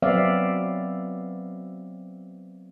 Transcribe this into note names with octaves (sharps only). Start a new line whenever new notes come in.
F#3 B3 C4 D5 E5 F5